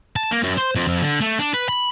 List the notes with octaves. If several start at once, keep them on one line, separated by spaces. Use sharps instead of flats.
A5
A#3
F#2
C5
F2
F2
D3
A3
D4
B4
B5